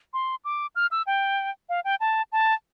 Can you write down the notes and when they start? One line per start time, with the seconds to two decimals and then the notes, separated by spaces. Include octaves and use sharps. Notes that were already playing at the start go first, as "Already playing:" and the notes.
0.14 C6
0.45 D6
0.76 F6
0.91 E6
1.07 G5
1.69 F5
1.84 G5
2.00 A5
2.32 A5